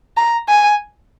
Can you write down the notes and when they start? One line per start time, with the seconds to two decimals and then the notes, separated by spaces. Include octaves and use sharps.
0.17 A#5
0.49 G#5